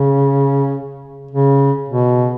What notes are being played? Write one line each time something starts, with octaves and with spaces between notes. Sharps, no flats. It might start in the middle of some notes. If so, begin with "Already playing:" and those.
Already playing: C#3
C#3
B2